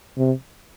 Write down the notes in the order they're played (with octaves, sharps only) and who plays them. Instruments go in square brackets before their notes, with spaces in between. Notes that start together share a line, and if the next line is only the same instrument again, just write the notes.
[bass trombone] C3